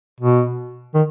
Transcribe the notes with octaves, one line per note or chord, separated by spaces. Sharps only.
B2
D#3